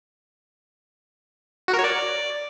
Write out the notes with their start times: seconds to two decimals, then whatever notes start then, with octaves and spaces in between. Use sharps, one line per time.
1.68 F#4
1.73 A#4
1.79 C#5
1.84 D5